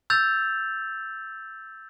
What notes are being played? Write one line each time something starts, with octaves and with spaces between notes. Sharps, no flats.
E6 G6 A6 F7